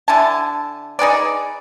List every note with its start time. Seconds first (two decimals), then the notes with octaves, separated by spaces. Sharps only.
0.08 D3 E4 G#5 A5
0.99 D#4 G#4 B4 D5